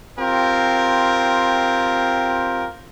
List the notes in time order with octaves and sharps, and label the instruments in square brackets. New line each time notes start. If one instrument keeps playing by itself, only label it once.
[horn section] C4 F4 G4 A#4